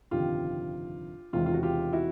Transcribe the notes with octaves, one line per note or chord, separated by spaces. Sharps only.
G1 F2 C3 D#3 F4 G4
E1 E2 C3 D#3 G#3 F4
F4
F#4
F4 G4
E4 F#4